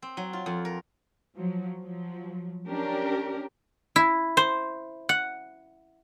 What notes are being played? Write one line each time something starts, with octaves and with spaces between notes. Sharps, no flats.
C4
F#3
F4
F2
A#4
F3 F#3
F3 F#3
C#4 D4 G4 A#4
E4
C5
F#5